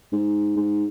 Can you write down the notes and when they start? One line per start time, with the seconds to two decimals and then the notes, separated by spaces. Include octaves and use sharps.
0.12 G#2
0.57 G#2